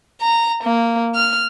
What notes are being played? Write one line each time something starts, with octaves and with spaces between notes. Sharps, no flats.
A#5
A#3
F6